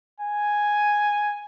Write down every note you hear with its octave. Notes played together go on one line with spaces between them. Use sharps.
G#5